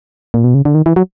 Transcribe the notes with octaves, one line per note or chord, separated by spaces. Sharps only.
A#2
B2
C#3
D3
D#3
E3
F#3